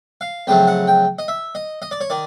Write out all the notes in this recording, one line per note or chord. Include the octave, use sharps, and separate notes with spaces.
F5
F2 C#3 F#3 A3 G5
F#5
G5
D#5
E5
D#5
D#5
D5
C#5
D#3 D5